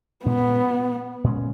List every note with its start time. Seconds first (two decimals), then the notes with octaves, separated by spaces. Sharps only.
0.25 A#2 G#3 B3 C#4
1.24 A#2 G#3 C#4